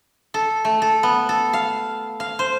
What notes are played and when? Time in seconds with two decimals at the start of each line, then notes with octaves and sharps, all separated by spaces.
0.34 A4
0.65 A3
0.82 A4
1.03 B3
1.29 A4
1.53 F5
2.20 F5
2.39 C5